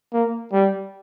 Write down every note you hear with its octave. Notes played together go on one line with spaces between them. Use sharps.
A#3
G3